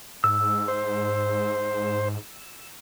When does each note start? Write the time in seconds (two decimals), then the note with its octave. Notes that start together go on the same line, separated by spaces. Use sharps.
0.24 G#2 E6
0.68 C5